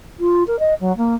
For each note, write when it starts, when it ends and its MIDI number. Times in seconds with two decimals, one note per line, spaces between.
0.20 0.44 65
0.47 0.59 70
0.59 0.74 75
0.80 0.96 54
0.97 1.15 58